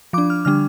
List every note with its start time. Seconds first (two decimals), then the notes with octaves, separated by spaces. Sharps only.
0.13 F3 D4 D6
0.30 F6
0.45 D3 G3 D4 F6